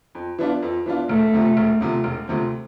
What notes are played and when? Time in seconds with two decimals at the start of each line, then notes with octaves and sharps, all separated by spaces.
0.15 F2
0.38 E3 B3 D4 F4
0.63 F2
0.86 E3 B3 D4 F4
1.09 E1 A3
1.33 D2 C3 F3
1.57 E1
1.81 D2 C3 F3
2.04 E1
2.28 D2 C3 F3